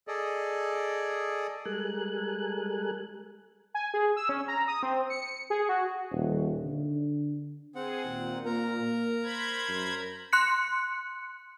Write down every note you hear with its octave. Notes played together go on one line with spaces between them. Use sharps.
G#4 A4 D5 D#5
G3 G#3 A4 A#4 G#5 F#6
G#5
G#4
E6
C#4
A#5
D#6
C4
C#7
G#4
F#4
D#1
D3
C4 G#4 F#5
D#2 A#2
A#3 A#4 A#5
C5 B5 G#6
F#2
C6 F#6 C#7